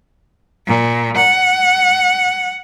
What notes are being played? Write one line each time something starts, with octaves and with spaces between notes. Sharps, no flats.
A#2
F#5